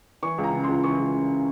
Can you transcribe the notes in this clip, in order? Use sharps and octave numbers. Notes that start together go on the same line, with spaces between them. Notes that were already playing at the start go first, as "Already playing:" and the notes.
E3 C#6
C#2
A#5
C#3
C#2 C6
E3 C#6
C#2
C#3